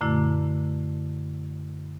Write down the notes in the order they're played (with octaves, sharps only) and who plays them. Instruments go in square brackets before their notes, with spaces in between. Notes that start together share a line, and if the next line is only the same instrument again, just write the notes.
[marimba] F#2 A#2 D3 A3 E4